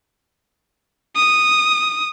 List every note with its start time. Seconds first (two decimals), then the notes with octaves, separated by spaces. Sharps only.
1.16 D#6